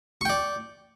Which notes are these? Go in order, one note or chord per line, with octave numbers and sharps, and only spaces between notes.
D5 G5 C#6